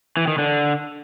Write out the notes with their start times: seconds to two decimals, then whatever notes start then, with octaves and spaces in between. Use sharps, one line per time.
0.17 E3
0.28 D#3
0.38 D3